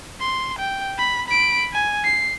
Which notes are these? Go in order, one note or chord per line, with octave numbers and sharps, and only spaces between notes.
C6
G5
B5
B5 D7
G#5
C7